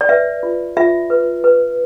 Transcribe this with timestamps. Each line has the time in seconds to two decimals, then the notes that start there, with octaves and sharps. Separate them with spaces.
0.01 D5
0.09 B4 E5
0.43 F4
0.77 F4 E5
1.10 B4
1.44 B4